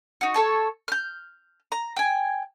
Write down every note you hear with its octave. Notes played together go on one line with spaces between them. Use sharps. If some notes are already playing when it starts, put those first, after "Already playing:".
D#4 F#4
A4 C#5 A5
F6 G6
A#5
G5 G#5